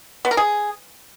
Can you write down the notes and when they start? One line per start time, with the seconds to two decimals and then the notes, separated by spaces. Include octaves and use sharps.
0.25 B3
0.31 A#4
0.37 G#4